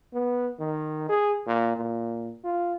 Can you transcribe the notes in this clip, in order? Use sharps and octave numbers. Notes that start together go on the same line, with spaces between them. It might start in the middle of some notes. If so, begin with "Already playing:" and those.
B3
D#3
G#4
A#2
A#2
F4